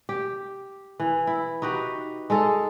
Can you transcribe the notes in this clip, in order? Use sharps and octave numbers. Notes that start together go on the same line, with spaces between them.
G4
E3
E4
D#4 F#4 G4 B4
G#3 D#4 A4